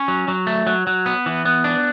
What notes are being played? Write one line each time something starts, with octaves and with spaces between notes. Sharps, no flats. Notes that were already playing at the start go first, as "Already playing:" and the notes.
Already playing: C#4
F#3
F#3
A3
F#3
F#3
B3
E3
B3
D4